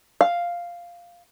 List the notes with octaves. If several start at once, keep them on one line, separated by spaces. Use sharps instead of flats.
F5